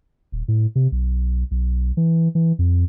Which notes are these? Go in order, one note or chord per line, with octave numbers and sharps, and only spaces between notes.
D#1
A2
C3
B1
B1
E3
E3
F2